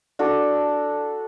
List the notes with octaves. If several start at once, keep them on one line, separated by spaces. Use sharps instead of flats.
D4 F#4 A4